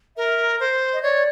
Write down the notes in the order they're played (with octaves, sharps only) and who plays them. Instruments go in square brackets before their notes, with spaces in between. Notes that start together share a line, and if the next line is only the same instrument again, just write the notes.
[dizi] A#4 [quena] E5
[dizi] C5
[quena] D#5
[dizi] C#5 [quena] D5